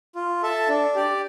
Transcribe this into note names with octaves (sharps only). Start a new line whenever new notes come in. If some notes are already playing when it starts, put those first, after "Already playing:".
F4
A4 E5 A5
D4
G4 D5